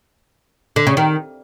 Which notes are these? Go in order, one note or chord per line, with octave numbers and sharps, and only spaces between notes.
D3
C#3
D#3